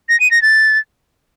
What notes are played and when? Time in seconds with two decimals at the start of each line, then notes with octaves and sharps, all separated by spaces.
0.09 A#6
0.20 D#7
0.31 A#6
0.42 A6